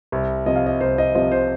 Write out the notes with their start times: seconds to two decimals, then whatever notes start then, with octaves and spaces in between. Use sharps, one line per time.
0.12 C2
0.46 C3 F3 D#5
0.56 F5
0.66 D#5
0.81 C2 C5
0.98 D#5
1.14 C3 F3 D#5
1.32 C5